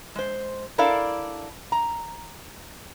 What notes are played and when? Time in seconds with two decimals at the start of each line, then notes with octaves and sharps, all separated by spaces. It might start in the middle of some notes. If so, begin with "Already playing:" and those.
0.15 G#3 C5
0.78 D4 E4 A4 A#4 D5 F5
1.72 A#5